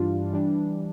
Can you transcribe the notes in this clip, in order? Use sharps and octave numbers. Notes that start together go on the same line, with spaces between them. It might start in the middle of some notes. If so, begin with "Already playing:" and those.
Already playing: G2 E3 G3 D4 F4
E3 G3 D4